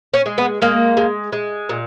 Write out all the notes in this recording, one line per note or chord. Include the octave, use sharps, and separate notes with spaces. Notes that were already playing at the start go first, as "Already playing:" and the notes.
C#4
G#3
B3
G#3 A#3
G#3
G#3
A#2